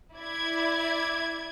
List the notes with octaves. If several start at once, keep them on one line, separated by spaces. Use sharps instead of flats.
E4 D5 G#6